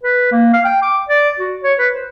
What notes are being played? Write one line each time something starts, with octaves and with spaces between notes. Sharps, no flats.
B4
A#3
F5
G5
D6
D5
F#4
C#5
B4
C5